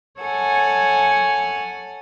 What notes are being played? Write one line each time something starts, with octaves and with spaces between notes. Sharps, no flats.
A4 C#5 F#5 G#5